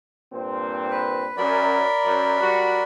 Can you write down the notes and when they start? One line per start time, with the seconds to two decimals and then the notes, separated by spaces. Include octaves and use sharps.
0.33 G2 A#2 C4
0.90 B4
1.37 F#2 A#4 D5 B5
2.05 F#2
2.40 G3 F#4